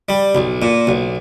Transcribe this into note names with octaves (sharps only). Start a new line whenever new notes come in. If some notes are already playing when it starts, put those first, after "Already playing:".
G3
B1
A#2
B1